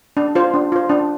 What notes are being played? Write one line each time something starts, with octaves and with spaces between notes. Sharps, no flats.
D4
F4 C5
D4
F4 C5
D4